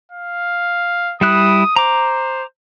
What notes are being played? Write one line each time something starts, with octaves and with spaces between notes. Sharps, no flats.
F5
G3 E4 D#6 F#6
C5 A#5 D6